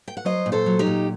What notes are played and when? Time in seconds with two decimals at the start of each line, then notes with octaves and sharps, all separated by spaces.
0.08 G5
0.17 F#5
0.25 F#3 C5 D#5
0.46 A#2
0.52 A4 C5
0.66 F#3
0.79 D#4 G4
0.86 A#2